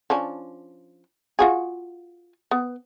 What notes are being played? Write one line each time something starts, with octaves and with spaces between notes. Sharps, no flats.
F3 C#4 D4
F4 F#4 G#4
B3